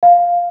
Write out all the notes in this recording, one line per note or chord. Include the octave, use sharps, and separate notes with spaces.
F5